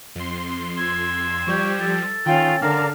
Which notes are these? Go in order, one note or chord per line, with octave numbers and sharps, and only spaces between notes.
F2 C6
E6 G#6
F3 G3 G4 C#6
A4
D#3 C#4 F4 G5
D3 A#4 D5 F5 A5 A#5